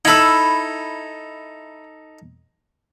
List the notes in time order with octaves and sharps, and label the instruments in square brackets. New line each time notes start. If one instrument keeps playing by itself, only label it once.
[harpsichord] D#4 A4 [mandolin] E4 B5 E6